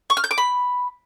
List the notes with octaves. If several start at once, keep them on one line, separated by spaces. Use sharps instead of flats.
C#6
F6
G6
D6
B5